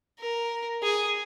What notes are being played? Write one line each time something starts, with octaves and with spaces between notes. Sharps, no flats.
A#4
G#4